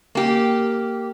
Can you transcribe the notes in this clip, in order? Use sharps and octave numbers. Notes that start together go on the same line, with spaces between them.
A#3 G4